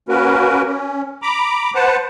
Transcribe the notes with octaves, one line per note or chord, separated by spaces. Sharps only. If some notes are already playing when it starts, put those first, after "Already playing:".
A#3 C#4 F#4 A#4 B4
C#4
A#5 B5 D6
B4 C5 F#5 A5